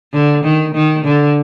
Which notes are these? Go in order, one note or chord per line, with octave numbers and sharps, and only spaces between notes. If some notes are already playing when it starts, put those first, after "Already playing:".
D3
D#3
D#3
D3